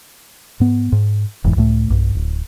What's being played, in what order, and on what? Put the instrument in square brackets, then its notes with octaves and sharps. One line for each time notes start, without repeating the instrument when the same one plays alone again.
[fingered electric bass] G#2 B3
G#2
F1 E2 G#2 E3
C#2 A2 A3
B1 G2
D1